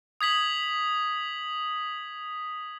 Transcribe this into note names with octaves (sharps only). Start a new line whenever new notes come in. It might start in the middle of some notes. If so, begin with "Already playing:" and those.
D#6 G#6 B6 F#7